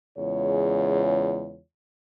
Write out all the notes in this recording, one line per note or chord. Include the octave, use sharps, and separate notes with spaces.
E2 C#3 G#3 F4 G#4 C#5